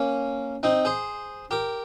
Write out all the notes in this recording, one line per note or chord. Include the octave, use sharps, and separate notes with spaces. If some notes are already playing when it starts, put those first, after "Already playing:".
Already playing: A#3 C#4
C4 D#4
G#4 C5
G4 A#4